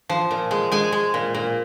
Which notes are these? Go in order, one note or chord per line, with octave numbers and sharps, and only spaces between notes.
F3
A#2
G#3
G#3 G#5
G#3
A#2
A#2